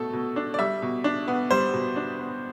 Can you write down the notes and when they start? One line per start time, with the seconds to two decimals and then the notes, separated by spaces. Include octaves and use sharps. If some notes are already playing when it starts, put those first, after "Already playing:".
Already playing: B2 A3 A4
0.13 B2
0.36 D4
0.54 D5
0.59 G3 E5
0.82 B2
1.04 D4
1.28 B3
1.51 G3 C5
1.74 B2
1.96 D4
2.19 B3